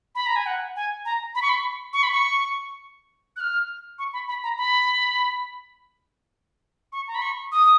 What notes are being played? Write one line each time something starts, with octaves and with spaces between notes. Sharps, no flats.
B5
A#5
G#5
F#5
G#5
A#5
B5
C#6
B5
C#6
B5
C#6
F#6
F6
C#6
B5
B5
A#5
B5
C#6
A#5
B5
C#6
D#6